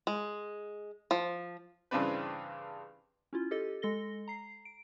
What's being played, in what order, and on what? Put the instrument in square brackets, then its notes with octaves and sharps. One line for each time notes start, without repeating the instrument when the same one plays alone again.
[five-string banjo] G#3
F3
[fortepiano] G2 C#3 E3 C4 D4 B4
[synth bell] C#4 E4 F4
G4 A4 D#5 A6
G#3 A4 A#6 G7
A#5 C7
D7